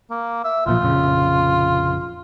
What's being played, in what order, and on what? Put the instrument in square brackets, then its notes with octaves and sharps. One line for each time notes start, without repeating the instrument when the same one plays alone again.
[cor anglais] A#3
E5
[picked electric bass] B1 A#2 F3 [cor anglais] F4
[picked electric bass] F1 A#1 C#3